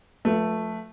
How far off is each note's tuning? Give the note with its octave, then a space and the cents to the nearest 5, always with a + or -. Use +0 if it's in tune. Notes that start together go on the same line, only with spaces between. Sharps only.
F3 +35 A3 +0 B4 -20